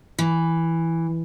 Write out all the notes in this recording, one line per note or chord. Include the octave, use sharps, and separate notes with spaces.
E3